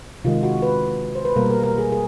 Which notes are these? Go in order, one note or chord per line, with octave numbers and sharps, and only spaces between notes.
C3 D#3 G#3 F4
F#4
B4
C5
B4
B2 G3 A#3 A#4
A#4
A#4
G#4
G#4